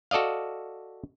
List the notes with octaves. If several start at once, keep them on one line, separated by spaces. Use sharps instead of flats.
F#4 A4 D5 D#5 F5